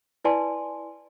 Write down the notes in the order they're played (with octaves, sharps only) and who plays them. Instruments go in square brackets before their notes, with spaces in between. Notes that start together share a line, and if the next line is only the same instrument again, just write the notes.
[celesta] E4 B4 D5 G#5 A5 C6